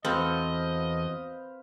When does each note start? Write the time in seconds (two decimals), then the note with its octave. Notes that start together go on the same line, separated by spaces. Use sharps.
0.05 E2 C4 F#4 A4 B4 C5 D#5 F5